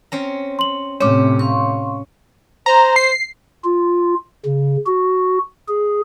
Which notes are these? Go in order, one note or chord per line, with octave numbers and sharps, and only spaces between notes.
C4 C#4 A#5
C6 F#7
A2 C3 C4 C#4 C#5 D6
F5 C6 C#6
C5 A#5
C7
F4
C#3
F#4
G#4